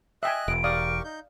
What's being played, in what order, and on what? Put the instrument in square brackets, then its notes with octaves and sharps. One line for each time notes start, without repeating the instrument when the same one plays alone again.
[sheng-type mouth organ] D#5 F#6 [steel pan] E5 G5 G#5
[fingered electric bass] E1 [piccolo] D7
[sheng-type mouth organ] G4 A#4 C#6 [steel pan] D5 F5 D#6
[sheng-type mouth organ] D#4 G6